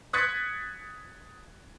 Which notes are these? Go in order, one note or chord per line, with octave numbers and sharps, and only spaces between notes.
D#6 F#6 G#6 A6 B6 C#7